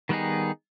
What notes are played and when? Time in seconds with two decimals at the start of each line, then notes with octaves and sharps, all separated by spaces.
0.09 D#3 G3 B3 D#4 G#4